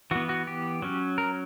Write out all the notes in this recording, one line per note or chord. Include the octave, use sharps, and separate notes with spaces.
E3 B3 F#4
F#4
G4
F#3 C#4
A#4